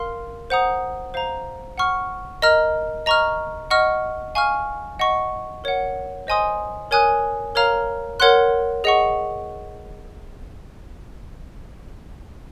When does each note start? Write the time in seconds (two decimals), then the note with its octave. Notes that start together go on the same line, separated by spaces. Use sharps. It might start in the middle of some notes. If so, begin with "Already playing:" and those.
Already playing: A#4 F5 C6 F6
0.50 C5 F#5 A#5 D#6
1.14 C5 F5 A#5
1.78 F#5 C#6 F6
2.42 A#4 D#5 A#5 F6
3.06 D#5 A#5 C#6 F6
3.71 D#5 F#5 C#6 F6
4.35 F5 G#5 C#6 F6
4.99 D#5 F#5 C#6
5.64 A#4 C#5 F#5
6.27 C5 D#5 G#5 C6 D#6
6.91 A#4 C#5 G#5 D#6 F#6
7.55 A#4 C#5 F5 A#5 F6
8.20 A#4 C#5 F#5 C6 F#6
8.84 G#4 D#5 F#5 C#6